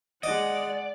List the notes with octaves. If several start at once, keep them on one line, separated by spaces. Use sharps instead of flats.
G#3 D5 D#5 F#5